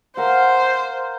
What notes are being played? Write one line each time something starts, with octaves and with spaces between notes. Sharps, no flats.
A#4 C5 F5 F#5